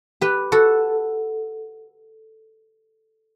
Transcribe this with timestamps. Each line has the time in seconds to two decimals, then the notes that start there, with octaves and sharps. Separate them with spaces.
0.21 G4 B4
0.52 F#4 A4